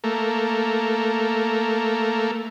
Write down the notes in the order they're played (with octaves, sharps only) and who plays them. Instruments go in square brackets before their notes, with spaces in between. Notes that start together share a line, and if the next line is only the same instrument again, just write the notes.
[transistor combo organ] A3 A#3